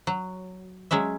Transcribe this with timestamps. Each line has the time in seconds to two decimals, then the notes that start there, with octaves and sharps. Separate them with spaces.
0.07 F#3
0.91 F#3 G#3 C#4 E5